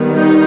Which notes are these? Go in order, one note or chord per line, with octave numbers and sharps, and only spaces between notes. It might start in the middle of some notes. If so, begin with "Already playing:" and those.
Already playing: D#3 G3 B3
D#4